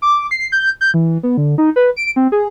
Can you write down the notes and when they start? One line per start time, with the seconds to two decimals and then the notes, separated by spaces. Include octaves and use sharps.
0.02 D6
0.31 C7
0.52 G6
0.81 G6
0.94 E3
1.23 B3
1.37 D3
1.58 D#4
1.76 B4
1.96 D7
2.16 C4
2.32 G#4